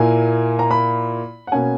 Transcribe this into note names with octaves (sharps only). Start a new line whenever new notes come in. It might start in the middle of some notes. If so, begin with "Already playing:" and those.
Already playing: A#2 A#3 E4 G#5
A#5
B5
F#5
B2 A#3 C#4 G#5